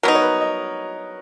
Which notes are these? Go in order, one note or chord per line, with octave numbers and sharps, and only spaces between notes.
F#3 B3 D#4 A#4
C#5
B4
D#5